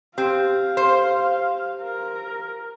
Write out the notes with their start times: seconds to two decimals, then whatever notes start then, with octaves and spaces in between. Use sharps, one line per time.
0.18 C4 G4 F5
0.77 C5
1.82 A#4